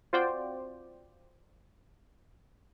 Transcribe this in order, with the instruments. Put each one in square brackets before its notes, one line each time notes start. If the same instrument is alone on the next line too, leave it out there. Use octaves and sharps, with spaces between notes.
[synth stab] C4 F4 F#4 C5 D5 G5